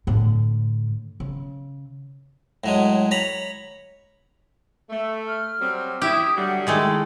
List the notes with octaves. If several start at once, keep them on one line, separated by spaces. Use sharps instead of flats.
A2 D3
C#3
A2 F#3 G#3
C#5 A#5 B5
A3
F6
F#3 G3 C4
E4 G4 D#6
D3 F#3 G3 F#5
D#3 G#3 A3 E4